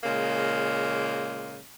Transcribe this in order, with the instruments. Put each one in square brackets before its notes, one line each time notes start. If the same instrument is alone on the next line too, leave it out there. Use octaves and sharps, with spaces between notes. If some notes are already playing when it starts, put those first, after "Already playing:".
[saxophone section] A#2 C#3 G#3 A#3